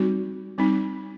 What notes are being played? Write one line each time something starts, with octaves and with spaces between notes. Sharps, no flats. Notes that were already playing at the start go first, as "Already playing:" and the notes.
Already playing: G3 C4 D#4 F#4
G3 C4 D#4